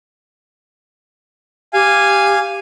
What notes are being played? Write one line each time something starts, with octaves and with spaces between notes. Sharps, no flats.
G4 F5 G#5